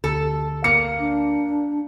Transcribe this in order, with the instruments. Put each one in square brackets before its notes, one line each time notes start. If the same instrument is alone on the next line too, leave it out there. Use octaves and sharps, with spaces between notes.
[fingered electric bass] D2 [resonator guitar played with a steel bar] A4
[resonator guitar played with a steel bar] A#3 [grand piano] C#7
[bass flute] D4